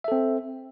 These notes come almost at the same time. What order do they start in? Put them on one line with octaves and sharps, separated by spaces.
E5 A4 C4